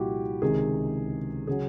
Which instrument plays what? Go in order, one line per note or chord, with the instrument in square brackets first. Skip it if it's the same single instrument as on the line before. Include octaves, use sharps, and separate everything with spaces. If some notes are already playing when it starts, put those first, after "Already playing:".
Already playing: [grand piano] C2 A#2 F3 E4 F#4 G4
C#2 C3 D#3 G#4
C#3 F#3 G#4